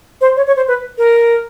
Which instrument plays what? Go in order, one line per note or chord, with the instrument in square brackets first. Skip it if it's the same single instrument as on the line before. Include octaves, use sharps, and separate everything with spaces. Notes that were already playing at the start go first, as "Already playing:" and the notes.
[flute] C5
C#5
C#5
C5
B4
A#4